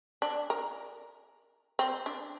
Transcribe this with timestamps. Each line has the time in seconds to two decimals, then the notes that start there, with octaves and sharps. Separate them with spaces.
0.22 D4
0.50 A#4
1.79 C4
2.06 D4